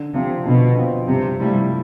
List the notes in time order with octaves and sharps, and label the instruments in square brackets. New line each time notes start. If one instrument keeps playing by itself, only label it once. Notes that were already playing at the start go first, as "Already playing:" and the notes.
Already playing: [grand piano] D3
[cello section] C3 [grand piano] F3 C4
[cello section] B2 [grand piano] D3
[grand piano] F3 C4
[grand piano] G2 [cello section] C3
[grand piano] F3 A3 E4 [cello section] G3